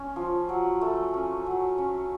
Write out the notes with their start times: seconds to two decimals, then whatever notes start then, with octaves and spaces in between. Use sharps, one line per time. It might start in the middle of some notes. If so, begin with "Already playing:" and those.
Already playing: C#4
0.16 F3
0.49 F#3
0.81 A3
1.14 C#4
1.46 F#3
1.78 C#4